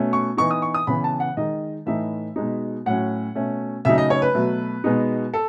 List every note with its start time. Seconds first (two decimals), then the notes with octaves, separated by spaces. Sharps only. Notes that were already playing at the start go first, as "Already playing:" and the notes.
Already playing: B2 A3 C#4
0.13 C#6
0.37 E3 B3 D#4 C#6
0.51 D#6
0.62 C#6
0.74 D#6
0.87 C#3 E3 B3 B5
1.04 A5
1.20 F#5
1.37 D#3 G#3 D#4 D#5
1.86 A2 E3 A3 D#4 E5
2.36 B2 G#3 D#4
2.86 A2 F#3 C#4 F#5
3.35 B2 A3 C#4
3.85 C#3 F#3 A3 D#4 E5
3.98 D#5
4.10 C#5
4.22 B4
4.34 B2 F#3 A3
4.84 B2 G#3 B3 D#4
5.33 A4